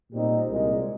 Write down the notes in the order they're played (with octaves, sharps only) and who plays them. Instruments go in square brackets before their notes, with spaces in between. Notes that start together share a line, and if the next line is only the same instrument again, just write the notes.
[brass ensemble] A#2 G3 C4 D#4
C2 A#2 G#3